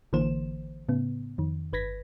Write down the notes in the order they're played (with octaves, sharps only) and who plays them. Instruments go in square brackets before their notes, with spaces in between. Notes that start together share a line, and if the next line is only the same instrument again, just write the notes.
[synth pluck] A1 D3 E3 A#3 C5 E7
A2 C#3 B3
F2 D#3
G1 B4 G#6 A#6 B6